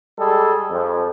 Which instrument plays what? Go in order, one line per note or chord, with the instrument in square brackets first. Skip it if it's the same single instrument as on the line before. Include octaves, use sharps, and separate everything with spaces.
[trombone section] G3 G#3 G#4 A4
F2